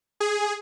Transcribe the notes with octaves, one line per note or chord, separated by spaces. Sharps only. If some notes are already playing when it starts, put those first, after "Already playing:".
G#4